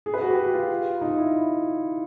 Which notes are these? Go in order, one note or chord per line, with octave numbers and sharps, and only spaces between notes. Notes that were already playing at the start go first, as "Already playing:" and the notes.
G#4
B4
F#4
G4
F#4
F4
D#4
E4